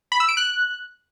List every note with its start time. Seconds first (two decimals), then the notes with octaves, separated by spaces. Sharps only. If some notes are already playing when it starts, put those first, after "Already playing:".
0.12 B5
0.20 E6
0.29 D7
0.37 F#6